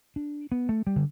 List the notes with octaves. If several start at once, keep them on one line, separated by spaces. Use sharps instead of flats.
D4
B3
A3
G3
D3